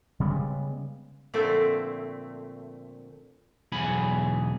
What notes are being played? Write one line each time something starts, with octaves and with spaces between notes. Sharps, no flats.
C#3 G3 G#3 B3
A#2 D3 F3 A3 C4 D5
B1 E2 G#4 B5